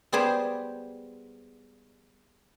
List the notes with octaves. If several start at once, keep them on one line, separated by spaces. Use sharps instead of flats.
G3 B3 G#4 C5 D5